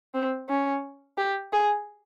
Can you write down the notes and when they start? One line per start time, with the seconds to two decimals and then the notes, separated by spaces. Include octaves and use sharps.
0.14 C4
0.49 C#4
1.18 G4
1.52 G#4